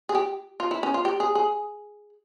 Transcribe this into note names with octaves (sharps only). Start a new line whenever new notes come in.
G#4
G4
F4
E4
C#4
F4
G4
G#4
G#4